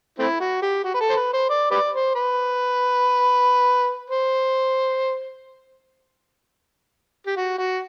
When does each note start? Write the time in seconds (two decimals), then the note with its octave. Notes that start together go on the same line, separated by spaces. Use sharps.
0.19 A3 C4 E4
0.40 F#4
0.62 G4
0.84 F#4
0.94 B4
1.00 A4
1.10 C5
1.16 B4
1.33 C5
1.49 D5
1.71 G4 B4 D5
1.93 C5
2.15 B4
4.10 C5
7.27 G4
7.37 F#4
7.58 F#4